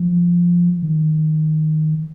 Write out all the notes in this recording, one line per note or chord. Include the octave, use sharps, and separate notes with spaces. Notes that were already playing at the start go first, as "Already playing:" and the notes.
Already playing: F3
D#3